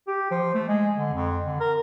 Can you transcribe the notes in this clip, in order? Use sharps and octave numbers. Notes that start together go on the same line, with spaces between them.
G4
F3
A3
G#3
D3
F2
D3
A#4